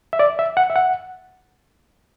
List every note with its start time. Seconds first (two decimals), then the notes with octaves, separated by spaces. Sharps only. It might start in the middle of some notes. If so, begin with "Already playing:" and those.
0.13 E5
0.19 D5
0.39 E5
0.57 F#5
0.70 E5
0.76 F#5